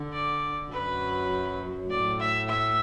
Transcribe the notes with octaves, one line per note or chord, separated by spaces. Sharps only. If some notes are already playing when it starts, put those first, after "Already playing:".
Already playing: D3
D5
F#2 F#3 B4
A2 A3 D5
E5
E5